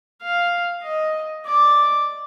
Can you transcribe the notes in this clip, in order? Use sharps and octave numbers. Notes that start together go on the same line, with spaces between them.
F5
D#5
D5